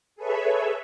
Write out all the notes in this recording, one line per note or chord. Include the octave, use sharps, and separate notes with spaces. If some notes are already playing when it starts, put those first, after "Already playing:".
G#4 A4 B4 C#5 E5